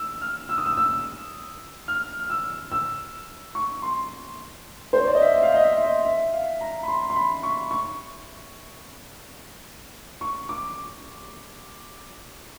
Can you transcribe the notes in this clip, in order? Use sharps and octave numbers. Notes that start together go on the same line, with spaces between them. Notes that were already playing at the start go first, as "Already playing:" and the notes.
Already playing: E6
F6
E6
D#6
E6
E6
F6
F6
E6
E6
C#6
C6
C5
C#5
D5
D#5
E5
E5
F5
D#5
E5
E5
D#5
E5
F5
A#5
B5
C6
C6
B5
C#6
C#6
C#6
D6